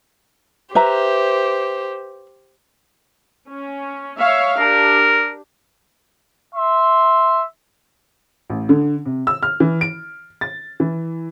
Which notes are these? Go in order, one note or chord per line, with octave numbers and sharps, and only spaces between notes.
G4 B4 C5 E5 A#5
C#4
C#5 E5 F5
D4 G4 A#4
E5 C6
A1
D3
C3
E6
F6
E3
D7
A6
E3